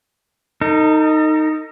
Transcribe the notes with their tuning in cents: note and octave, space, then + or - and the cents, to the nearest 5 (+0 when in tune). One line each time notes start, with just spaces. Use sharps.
D#4 +0 A4 +45